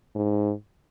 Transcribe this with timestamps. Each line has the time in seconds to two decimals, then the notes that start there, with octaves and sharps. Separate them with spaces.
0.15 G#2